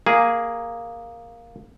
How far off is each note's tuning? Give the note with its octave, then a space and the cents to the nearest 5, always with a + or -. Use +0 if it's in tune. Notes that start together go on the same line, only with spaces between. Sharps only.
A#3 +0 G#4 +0